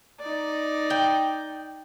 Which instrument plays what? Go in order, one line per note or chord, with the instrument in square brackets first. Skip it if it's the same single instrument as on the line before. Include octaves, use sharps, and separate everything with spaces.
[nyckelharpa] D#4 D5
[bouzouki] G5